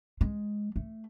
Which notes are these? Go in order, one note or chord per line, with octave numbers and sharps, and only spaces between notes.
G#3
A3